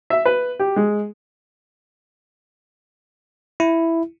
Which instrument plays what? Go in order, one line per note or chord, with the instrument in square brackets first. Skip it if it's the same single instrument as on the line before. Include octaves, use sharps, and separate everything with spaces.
[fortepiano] E5
B4
G4
G#3
[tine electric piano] E4